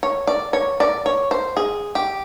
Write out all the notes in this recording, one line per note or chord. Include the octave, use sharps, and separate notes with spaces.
C#5
D5
C#5
D5
C#5
C5
G#4
G4